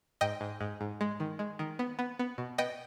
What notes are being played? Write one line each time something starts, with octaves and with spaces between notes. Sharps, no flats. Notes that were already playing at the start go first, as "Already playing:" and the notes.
G#2 D#5 G5
G#2
G#2
G#2
G#3
D#3
G#3
D#3
B3
B3
B3
B2
B3 D#5 G5